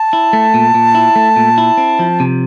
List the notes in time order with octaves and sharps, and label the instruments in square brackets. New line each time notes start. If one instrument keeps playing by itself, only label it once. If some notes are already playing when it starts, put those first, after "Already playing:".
Already playing: [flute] A5
[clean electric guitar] E4
A3
A#2
A#2
E4
A3
A#2
E4
C4
F3
C3